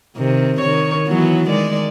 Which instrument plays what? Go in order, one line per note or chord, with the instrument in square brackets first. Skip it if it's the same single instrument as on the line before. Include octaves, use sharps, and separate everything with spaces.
[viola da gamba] C3 D#3
D#3 C#5
E3 F#3 B3
D#3 G#3 D5